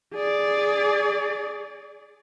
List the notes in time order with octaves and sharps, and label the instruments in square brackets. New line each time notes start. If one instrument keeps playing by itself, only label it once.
[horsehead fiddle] G#4 D5